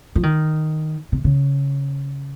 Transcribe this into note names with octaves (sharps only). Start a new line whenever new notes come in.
F3
D#3
C3
C#3